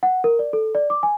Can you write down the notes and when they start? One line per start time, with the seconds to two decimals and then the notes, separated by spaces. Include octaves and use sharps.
0.03 F#5
0.24 A#4
0.39 D5
0.53 A4
0.75 D5
0.90 D6
1.03 G#5